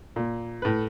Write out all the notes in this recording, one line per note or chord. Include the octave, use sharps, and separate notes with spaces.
A#2
A2 B4